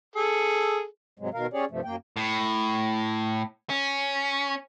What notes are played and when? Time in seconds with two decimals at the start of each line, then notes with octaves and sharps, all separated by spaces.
0.15 G#4 A4
1.19 G#2 C3 F#3 G#3
1.34 B2 D#3 A#4 F5
1.53 C#4 G4 G#4 C#5 D5
1.71 G2 C3 F3 A3
1.85 F#2 A#3 G5
2.17 A2
3.70 C#4